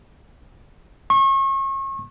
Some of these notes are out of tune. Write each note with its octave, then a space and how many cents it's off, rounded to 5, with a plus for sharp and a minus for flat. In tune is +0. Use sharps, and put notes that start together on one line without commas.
C#6 -35